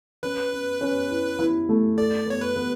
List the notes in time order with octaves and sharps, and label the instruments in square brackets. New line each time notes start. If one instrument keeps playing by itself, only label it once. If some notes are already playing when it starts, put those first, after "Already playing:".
[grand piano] C#4 [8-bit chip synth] B4
[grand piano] C#4
C#4
E4
E4
A3
[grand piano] A4 [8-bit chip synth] D5
[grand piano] B3 [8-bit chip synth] C#5
[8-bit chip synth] B4
[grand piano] B3